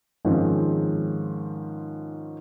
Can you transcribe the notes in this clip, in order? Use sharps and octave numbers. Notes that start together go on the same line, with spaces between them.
G#2 D#3 F3 G#3 C4 C#4